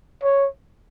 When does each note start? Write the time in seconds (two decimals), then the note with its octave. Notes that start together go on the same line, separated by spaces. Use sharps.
0.23 C#5